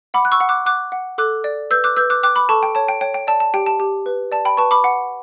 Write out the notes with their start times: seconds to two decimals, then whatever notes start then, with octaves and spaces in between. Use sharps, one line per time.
0.14 F#5 B5 D6
0.25 F#6
0.32 C#6 E6
0.40 F#5
0.49 D6 F#6
0.66 F#5 D6 F#6
0.92 F#5
1.18 A4 D6 F#6
1.44 D5
1.71 B4 E6 G6
1.84 D6 F#6
1.97 B4 E6 G6
2.10 D6 F#6
2.23 G5 D6 F#6
2.36 B5 D6
2.49 A4 A5 C#6
2.63 G5
2.75 C#5 A5
2.89 G5
3.01 C#5 G5
3.14 G5
3.27 D5 A5
3.40 A5
3.54 G4 G5
3.66 A5
3.80 G4
4.06 B4
4.32 D5 A5
4.45 G5 B5
4.57 B4 A5 C#6
4.71 B5 D6
4.84 F#5